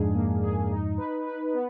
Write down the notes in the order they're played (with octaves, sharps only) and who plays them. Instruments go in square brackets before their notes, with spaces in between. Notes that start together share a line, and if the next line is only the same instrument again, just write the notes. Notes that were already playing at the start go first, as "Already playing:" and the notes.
Already playing: [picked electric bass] F2 G#2 [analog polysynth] D4 G#4
[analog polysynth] A#3
G#4
D#4
B4
B4
B3